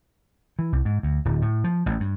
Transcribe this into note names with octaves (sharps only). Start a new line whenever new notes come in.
E3
C2
G#2
D2
D1
A2
F3
A1
G2